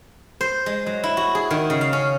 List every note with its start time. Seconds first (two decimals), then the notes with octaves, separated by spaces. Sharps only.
0.41 C5
0.66 G#3
0.86 F#3
1.04 E4
1.17 F#4
1.35 G#4
1.51 D#3
1.70 C#3
1.81 F5
1.93 C#4